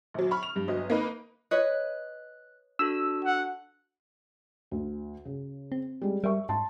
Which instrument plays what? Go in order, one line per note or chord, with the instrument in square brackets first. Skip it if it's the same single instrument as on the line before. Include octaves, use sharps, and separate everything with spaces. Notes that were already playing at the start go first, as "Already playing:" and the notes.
[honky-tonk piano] A#1 F#3
B5 C#6 F6
F7
G2
G1 F#3 D#5
A#3 D#4 B4
[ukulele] B4 C#5 D#5 [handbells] F#6
[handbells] D4 F#4 A4 [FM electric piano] E6
[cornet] F#5
[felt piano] D2
C#3
[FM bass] C4
[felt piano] G3 G#3
[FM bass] G3 [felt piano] A#4 E5 C#6
[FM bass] G#2 [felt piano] A5 C6